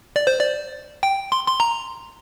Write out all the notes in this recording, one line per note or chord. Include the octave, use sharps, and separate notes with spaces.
D5
C5
D5
G5
C6
C6
A#5